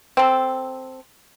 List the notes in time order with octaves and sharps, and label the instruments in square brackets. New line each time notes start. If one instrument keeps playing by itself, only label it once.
[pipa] C4 A4